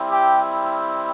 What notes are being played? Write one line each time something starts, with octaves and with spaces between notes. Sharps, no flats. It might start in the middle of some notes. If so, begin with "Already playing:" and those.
Already playing: G3 C4 E4
G4 G5